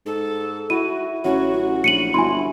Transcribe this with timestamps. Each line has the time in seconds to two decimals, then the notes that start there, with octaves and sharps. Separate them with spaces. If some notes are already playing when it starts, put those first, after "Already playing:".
0.06 G#2 A4
0.70 E4 F#4 D#7
1.24 A1 F#3 C#4 F#4
1.84 A#1 C#7 D#7 F#7
2.14 G1 E4 G#5 C6